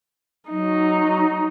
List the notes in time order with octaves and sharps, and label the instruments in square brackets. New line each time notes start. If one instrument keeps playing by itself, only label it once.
[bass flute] F#3 [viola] D#4